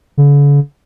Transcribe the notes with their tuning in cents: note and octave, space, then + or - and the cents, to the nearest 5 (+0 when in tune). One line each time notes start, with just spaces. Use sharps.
D3 -45